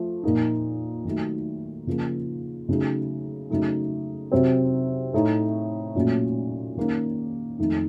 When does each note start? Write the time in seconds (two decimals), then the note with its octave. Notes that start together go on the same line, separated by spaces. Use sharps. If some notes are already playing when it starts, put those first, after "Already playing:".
Already playing: F3 A3
0.23 A#2 F3 A#3 D#4
1.05 D#3 F#3 A3
1.87 C#3 F3 A#3
2.69 C#3 F#3 A3 D#4
3.50 C#3 F#3 A3 D#4
4.32 C3 F#3 C4
5.13 A2 A3 D#4
5.95 A#2 F#3 A3 C#4
6.77 D#3 A#3 C#4
7.59 F2 D#3 A3 D#4